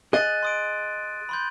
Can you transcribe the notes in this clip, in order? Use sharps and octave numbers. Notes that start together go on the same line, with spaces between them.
G#4 D#5 F#6 A6 D#7
C6 D#6 D7
B5 C6 G6